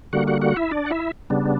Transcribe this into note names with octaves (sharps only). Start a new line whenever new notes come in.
D3 G3 A#3 F#4 F#5
F#4 F#5
F#4 F#5
E4 E5
D4 D5
F#5
E4 E5
C#3 G3 B3 D4